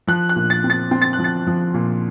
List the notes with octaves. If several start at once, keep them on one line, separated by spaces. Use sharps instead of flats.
F3 F#6
F#6
A#2
A6
C4
A6
C4
A6
F#6
F3
A6
F3
A#2